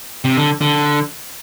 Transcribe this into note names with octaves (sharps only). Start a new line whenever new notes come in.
C3
D3
D3